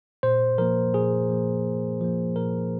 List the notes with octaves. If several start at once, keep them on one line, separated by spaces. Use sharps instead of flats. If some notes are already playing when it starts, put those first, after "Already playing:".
A#2 C5
F3 A#3 A#4
A#2 G#4
F3 A#3
A#2
F3 A#3
A#2 A#4